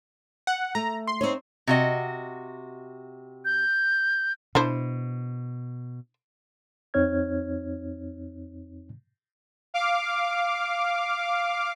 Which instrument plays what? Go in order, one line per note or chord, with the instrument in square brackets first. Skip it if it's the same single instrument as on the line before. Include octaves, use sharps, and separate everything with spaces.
[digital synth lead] F#5
[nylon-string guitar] A3 [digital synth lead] A#5
[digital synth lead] C6
[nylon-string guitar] C4 D#4 C#5
[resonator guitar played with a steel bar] C3 F#4 D#5
[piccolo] G6
[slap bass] B2 [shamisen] D4 E4 C5
[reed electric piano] F2 C4 D#4 C#5 F6 G#6
[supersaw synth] F5 D6